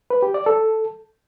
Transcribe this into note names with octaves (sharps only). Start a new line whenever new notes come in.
B4
G4
D5
A4